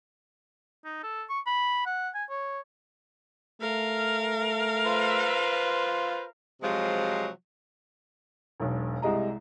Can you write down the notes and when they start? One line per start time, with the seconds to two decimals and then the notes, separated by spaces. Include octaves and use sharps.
0.85 D#4
1.03 A4
1.29 C#6
1.47 B5
1.86 F#5
2.15 G#5
2.30 C#5
3.61 A3 A#4 F5
4.85 F4 B4 C5
6.62 C3 F3 F#3 G#3
8.60 E1 B1
9.02 C2 C3 G#3 D#5 A#5